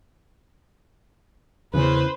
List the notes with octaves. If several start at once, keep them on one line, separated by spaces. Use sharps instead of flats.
E2 C#3 E3 B4 C5